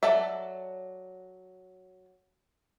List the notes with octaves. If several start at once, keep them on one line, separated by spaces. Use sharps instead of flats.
F#3 A4 D5 E5